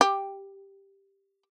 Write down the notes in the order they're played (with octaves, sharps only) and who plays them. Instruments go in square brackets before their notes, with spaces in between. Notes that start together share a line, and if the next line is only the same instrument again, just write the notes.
[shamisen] G4